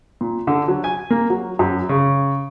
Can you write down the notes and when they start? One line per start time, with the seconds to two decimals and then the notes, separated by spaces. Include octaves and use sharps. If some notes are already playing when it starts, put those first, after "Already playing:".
0.21 A#2
0.47 D3
0.68 F#3
0.84 G#5
1.10 A#3
1.30 F#3
1.59 F#2
1.89 C#3